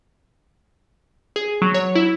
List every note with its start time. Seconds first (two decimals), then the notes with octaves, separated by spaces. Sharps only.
1.36 G#4
1.62 F#3
1.74 C#5
1.95 E4